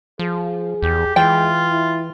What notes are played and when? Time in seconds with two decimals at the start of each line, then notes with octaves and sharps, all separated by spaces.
0.19 F3 G#4
0.83 E2 G4
1.16 E3 G#3 F4 G5
1.69 E4